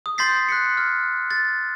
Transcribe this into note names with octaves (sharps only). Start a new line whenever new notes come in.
D#6
C6 G6 A6 B6 C7
F#6 B6 C#7
F6
A6